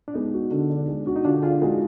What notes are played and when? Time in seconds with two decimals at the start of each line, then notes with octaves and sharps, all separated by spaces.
0.08 D4
0.14 G#3 B3 D#4
0.34 F#4
0.51 D3
0.70 D4
0.88 G#3
1.06 D4 F#4
1.16 D#4
1.24 D3 D4 F4
1.43 D4 F4 G#4
1.62 G#3 D#4 F#4